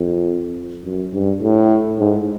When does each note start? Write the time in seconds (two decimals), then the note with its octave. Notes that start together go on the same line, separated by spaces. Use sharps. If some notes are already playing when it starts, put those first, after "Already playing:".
Already playing: F2
0.84 F#2
1.13 G2
1.42 A2
1.99 G#2